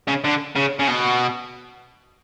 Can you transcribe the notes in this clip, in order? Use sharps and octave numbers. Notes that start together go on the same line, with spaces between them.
C#3
D3
C#3
C#3
B2